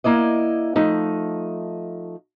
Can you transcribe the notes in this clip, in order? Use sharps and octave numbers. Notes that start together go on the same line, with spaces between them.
A#3 E4 D5 D#5
F3 A3 D#4